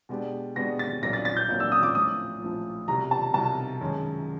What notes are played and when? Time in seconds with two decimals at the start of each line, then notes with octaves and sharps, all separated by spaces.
0.09 B2 G#3 B3 D4 G4
0.56 B2 G#3 B3 D4 G4 A#6
0.79 A6
1.02 A#1 A#2 F#3 A#3 D4 A#6
1.13 A6
1.25 A6
1.37 G6
1.48 A#1 A#2 F#3 A#3 D4
1.60 E6
1.72 D#6
1.83 D6
1.95 A#1 A2 F3 D#6
2.42 A#1 A2 F3
2.88 C2 B2 G3 A#5
3.11 A5
3.34 C2 B2 G3 A5
3.81 F#2 D#3 G#3 C#4